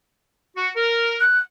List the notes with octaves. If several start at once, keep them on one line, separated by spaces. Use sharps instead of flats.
F#4
A#4
F#6